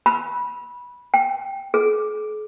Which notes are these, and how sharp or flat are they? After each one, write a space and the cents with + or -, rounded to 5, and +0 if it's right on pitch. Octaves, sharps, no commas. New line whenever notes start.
B5 -15
G5 +0
G#4 +45